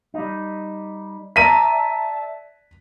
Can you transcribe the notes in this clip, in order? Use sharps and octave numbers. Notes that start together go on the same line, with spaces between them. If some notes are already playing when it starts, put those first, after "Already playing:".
G3 D#4
D5 E5 A5 A#5 B6 D#7